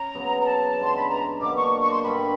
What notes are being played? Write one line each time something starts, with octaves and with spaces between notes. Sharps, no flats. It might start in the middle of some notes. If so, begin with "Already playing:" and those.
Already playing: C#4 A#5
C#3 F#3 B3
A#5
A5
G2 E3 G#3 B3 C6
B5
A#5
B2 F#3 A#3 D4 D6
C#6
C#6
C6
G2 D3 G3 B5